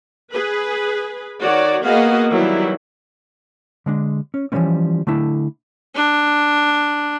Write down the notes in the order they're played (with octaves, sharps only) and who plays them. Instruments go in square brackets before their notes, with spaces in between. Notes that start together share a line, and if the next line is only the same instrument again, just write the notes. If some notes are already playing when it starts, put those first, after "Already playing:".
[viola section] G#4 B4
D#3 F#4 C#5 D5
A#3 B3 F#4 G#4 D#5 F5
D#3 E3 F#3 G3 E4
[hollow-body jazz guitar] D3 G#3 D4
C#4
E3 F3 G3 G#3 C4 C#4
D3 A3 D4 E4
[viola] D4